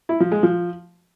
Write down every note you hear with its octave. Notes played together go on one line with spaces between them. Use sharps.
E4
F3
G#3
F3